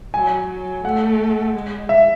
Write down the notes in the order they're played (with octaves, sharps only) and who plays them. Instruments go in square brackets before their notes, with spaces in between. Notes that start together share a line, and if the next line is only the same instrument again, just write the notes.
[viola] F#3 [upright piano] G#5
[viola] F#3
[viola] A3 [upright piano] F#5
[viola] G#3
[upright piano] E5